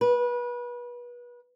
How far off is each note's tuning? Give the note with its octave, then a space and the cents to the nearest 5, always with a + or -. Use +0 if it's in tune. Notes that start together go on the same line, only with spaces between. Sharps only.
B4 -30